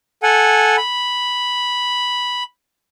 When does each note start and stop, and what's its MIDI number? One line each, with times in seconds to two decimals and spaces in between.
0.23 0.76 69
0.23 0.76 78
0.23 0.76 80
0.77 2.43 83